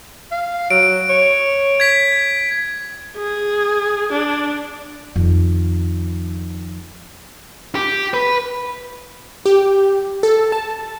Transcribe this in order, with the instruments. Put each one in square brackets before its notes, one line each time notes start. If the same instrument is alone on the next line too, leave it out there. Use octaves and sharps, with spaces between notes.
[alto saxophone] F5
[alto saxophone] F#3 [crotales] D7
[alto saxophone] C#5
[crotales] G#6 B6
[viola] G#4
D4
[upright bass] F2 D#3
[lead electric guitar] G4
B4
[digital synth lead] G4
A4
A5